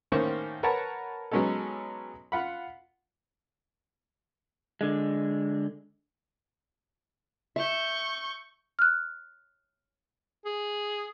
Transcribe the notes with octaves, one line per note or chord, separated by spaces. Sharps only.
A2 D#3 A#3 C#4 C5 C#6
A#4 B4 C#5 F#5 A5 A#5
F#3 G#3 B3 C#4 D#4 A4
F4 F#5 B5
D3 G#3
E5 C#6 G6
F6 F#6
G#4